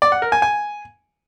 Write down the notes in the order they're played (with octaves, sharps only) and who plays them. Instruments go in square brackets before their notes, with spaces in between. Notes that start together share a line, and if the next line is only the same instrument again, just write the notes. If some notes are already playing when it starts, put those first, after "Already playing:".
[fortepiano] D5
F#5
A#4
G#5
G#5